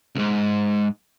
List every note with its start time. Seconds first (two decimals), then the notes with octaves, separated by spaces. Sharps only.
0.15 C#2 G#2